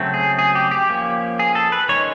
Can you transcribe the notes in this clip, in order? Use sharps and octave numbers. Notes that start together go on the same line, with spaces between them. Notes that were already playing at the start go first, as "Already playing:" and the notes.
Already playing: C#3 F#3 A3 C4
G#4
G#4
G4
G4
F3 A#3 C#4
G#4
A4
B4
D#3 G#3 C#4 C#5